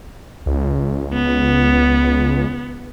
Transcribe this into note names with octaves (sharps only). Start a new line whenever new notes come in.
C#2
B3